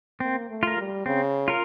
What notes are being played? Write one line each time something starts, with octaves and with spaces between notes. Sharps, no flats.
A#3 C4
A3
F4 A#4
G3
C#3 C4
F4 A#4